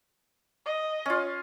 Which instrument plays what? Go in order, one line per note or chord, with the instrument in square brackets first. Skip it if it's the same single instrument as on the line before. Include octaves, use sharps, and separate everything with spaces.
[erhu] D#5
[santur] C#4 F4